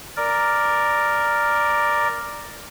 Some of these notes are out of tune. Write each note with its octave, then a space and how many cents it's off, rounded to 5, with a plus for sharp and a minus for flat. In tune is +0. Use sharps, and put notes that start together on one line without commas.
A#4 +0 D5 +5